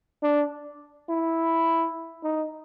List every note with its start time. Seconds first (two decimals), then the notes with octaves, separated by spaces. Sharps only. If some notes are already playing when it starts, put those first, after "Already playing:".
0.23 D4
1.09 E4
2.24 D#4